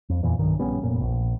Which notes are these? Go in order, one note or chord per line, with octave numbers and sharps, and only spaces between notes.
F2
E2 A#2 E3
B1 G2 D#3
A#1 G3 B3 C#4
F1 A#2
A#1